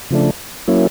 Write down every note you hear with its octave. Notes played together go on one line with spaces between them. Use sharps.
C#3 F3 A3 D4
F#3 A#3 C#4 E4